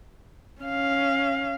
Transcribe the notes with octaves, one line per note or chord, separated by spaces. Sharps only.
C#4 F5